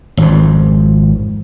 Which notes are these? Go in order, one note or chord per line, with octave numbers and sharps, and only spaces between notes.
G#1 F2